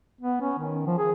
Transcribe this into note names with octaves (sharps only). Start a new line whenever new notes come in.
B3
C#4
D#3
F3
G#4